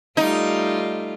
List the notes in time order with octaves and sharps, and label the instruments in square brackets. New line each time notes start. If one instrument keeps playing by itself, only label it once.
[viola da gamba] G3 A3 F4 [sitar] D#4